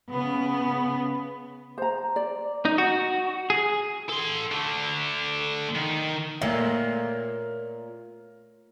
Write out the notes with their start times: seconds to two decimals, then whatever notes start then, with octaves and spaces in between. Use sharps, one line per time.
0.11 C#3 B3
1.78 C5 A#5
2.16 D5
2.65 D#4
2.78 F#4
3.50 G#4
4.09 A4 C6
4.52 D3 A3
5.75 D#3
6.42 A#2 A3 A#4 C#5 E5 F5